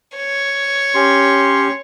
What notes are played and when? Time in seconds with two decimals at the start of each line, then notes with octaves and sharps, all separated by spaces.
0.16 C#5
0.95 C#4 G4 C6